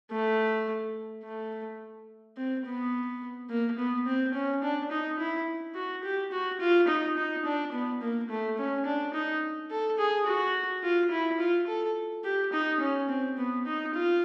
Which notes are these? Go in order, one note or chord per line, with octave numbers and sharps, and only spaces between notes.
A3
A3
C4
B3
A#3
B3
C4
C#4
D4
D#4
E4
F#4
G4
F#4
F4
D#4
D#4
D4
B3
A#3
A3
C#4
D4
D#4
A4
G#4
F#4
F4
E4
F4
A4
G4
D#4
C#4
C4
B3
D#4
F4